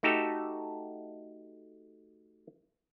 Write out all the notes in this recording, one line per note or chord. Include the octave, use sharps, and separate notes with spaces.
A3 D#4 F#4 G4 A4